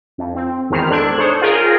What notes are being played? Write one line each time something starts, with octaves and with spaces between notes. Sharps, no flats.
F2
C4
G#1 E2 D#3 C5 F6
G#2 D4 A4 F#6 G#6
D4 D#4 G#4 C5 C#5
F4 G#4 A#4 G5